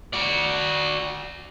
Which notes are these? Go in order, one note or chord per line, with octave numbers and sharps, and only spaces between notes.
F#4 D5